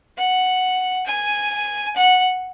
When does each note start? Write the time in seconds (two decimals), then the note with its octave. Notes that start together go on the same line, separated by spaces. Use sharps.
0.17 F#5
1.06 G#5
1.96 F#5